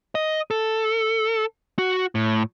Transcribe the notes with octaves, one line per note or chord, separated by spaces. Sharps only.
D#5
A4
F#4
A2